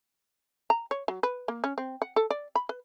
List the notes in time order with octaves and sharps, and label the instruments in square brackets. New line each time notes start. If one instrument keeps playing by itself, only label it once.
[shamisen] A#5
C#5
F#3
B4
A#3
C#4
C4
F#5
A4
D5
B5
B4